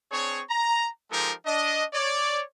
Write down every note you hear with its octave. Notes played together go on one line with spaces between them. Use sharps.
C4 D4 G#4 C#5
A#5
F3 G#3 D#4 G4 A4 A#4
D4 D#5
C#5 D5